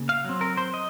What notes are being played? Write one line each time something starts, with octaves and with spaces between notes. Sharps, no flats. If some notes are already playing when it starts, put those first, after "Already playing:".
Already playing: C#3 A#3
F5
F#3 C4
A#4
C5
D#5